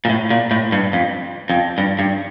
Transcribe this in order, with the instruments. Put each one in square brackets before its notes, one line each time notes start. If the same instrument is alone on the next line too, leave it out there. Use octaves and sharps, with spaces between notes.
[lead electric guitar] A#2
A2
A#2
A2
G2
F2
F2
G2
G2